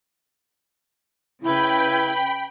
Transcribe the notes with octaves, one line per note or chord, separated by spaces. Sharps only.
C#3 E4 B4 G5 B5 G6